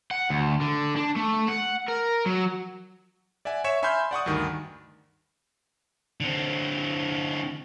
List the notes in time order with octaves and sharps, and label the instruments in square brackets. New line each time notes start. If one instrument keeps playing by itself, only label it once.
[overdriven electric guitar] F#5
D2
D3
D4
A3
F#5
A#4
F#3
[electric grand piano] D5 E5 F#5 G#5
C#5 E5 C#6 E7
E5 G#5 B5 C6 F6 G6
D5 F#5 C#6 D#6
D2 G2 D#3
[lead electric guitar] D3 C4